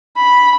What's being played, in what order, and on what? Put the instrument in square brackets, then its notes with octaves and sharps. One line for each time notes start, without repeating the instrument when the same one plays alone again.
[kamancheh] B5